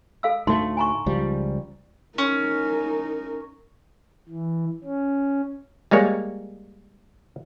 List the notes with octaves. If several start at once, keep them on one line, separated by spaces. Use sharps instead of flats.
A4 F5 E6
D2 A2 A3 D#4 C6
G#5 A#5 C#6
C#2 F3 G3
C#4 D#4 A#4
E3
C#4
G3 G#3 A#3 C#5